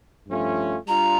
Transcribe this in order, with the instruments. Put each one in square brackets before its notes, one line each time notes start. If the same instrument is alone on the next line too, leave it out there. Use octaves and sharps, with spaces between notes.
[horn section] G2 F3 A3 C#4 F4
[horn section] G3 D4 F4 [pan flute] A#5